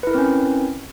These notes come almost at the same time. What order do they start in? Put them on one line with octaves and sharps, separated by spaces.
B4 E4 A#4 C4 C#4